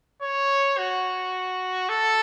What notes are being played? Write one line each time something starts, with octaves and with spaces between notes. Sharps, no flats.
C#5
F#4
A4